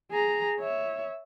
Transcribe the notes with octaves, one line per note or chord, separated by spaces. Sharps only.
G#4 A#5
C#5 E5